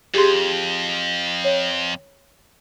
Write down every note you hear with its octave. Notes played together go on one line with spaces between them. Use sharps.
F2 G4 G#4 C6
C#5